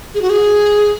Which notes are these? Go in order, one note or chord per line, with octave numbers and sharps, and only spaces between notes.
G#4
F#4
G#4